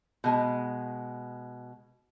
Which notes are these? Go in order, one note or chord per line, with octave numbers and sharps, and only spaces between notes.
B2 G#3